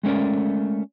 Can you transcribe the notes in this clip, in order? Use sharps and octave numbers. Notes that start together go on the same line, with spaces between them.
G#3 A3 C#4 A#4 D5